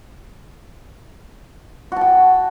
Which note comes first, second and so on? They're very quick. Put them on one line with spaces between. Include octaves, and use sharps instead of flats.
F#4 A5 G5